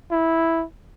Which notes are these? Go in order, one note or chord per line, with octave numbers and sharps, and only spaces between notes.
E4